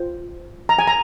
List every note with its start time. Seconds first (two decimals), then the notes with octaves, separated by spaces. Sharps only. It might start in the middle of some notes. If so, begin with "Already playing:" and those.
Already playing: F4 C5
0.69 A#5
0.79 G#5
0.87 A#5